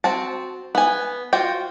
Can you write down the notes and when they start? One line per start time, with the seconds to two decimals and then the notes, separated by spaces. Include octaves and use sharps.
0.04 C4 F#4 A5
0.75 B3 G#5
1.33 F4 F#4 C5 G5